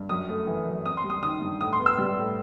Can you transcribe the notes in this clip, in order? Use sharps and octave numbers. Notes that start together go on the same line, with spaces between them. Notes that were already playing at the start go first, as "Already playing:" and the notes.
Already playing: G2
F#2 D#6
A3
E3
F#2
C4 D#6
C6
G3
D#6
D#3 D#6
G2
A2 D#6
C6
B3
E6
G3
A2